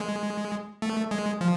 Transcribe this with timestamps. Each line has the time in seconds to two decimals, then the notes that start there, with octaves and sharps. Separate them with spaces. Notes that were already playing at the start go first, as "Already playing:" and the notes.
Already playing: G#3
0.82 A3
1.11 G#3
1.41 F3